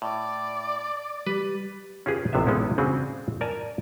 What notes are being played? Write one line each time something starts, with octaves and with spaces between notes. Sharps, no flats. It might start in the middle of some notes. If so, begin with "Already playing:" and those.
A2 D5
G3 B4
C#4 F4 G4 G#4 B4
A1 C3 B3 F4 E5
F#3 G#3 B3 C#4 D#4 E4
C#3 C4 D4 F#4 G#4
A#4 D5 G#5 A5